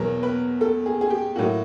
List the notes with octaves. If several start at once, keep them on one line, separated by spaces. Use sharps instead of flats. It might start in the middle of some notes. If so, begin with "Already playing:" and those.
Already playing: E2 B2 F#3 A#4
B4
A4
G#4
G#4
G4
A2 F#3 A#3 F#4